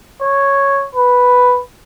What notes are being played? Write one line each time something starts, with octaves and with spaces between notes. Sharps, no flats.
C#5
B4